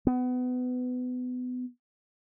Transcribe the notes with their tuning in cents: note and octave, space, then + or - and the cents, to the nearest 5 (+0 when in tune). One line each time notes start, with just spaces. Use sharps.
B3 +25